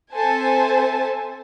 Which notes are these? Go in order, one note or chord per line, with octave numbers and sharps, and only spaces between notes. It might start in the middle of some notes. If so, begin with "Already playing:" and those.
C4 A4 C5 E5 G#5 A5